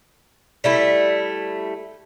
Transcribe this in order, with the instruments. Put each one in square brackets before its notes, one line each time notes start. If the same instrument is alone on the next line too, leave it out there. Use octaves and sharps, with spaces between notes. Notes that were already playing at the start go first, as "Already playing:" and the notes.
[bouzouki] G3 A3 E4